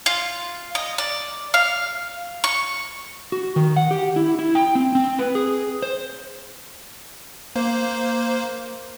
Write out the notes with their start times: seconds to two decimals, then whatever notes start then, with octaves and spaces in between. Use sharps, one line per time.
0.06 F4
0.75 D#5
0.98 D5
1.54 F5
2.44 C#6
3.32 F#4
3.56 D#3
3.76 F#5
3.91 G4
4.16 E4
4.39 E4
4.55 G5
4.75 C4
4.95 C4
5.19 B4
5.35 G#4
5.82 C5
7.56 A#3 C5